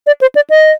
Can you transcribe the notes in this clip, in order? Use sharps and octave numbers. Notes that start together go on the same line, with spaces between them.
D5
C5
D5
D#5